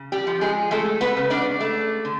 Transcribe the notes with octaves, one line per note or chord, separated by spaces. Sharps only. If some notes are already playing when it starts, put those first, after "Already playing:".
Already playing: C#3
G3 G4
F3
G#3 G#4
G#3 A3 A4
B3 B4
C#3
D4 D5
A3
D3